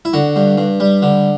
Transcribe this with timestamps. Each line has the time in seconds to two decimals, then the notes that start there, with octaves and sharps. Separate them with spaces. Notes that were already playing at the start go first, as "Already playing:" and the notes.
0.05 E4
0.13 D3 F#4
0.36 G2
0.58 G2
0.80 G3
1.02 D3